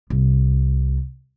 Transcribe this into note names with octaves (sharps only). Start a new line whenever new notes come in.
C2